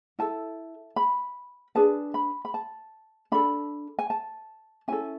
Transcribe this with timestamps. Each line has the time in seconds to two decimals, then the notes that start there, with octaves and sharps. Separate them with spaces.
0.19 E4 A4 A5
0.96 B5
1.75 D4 G#4 B4 A5
2.14 B5
2.45 B5
2.54 A5
3.32 D4 A4 B5
3.99 G#5
4.10 A5
4.88 C#4 E4 A4 G#5